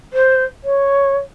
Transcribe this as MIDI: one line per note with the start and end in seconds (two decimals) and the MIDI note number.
0.13 0.44 72
0.64 1.17 73